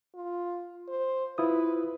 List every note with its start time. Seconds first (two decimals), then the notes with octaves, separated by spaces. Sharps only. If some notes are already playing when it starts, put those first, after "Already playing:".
0.15 F4
0.88 C5
1.38 E4 F4 B4 D#6